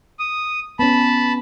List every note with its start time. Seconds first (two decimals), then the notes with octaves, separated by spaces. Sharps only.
0.19 D#6
0.79 B3 C#4 A5 B5